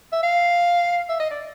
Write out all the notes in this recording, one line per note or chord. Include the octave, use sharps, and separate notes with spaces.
E5
F5
E5
D#5
D5